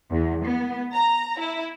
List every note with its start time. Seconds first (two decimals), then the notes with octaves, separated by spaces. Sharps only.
0.11 E2
0.45 B3
0.93 A#5
1.40 E4